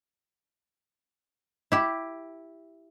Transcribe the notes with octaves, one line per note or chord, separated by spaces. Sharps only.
E4 G4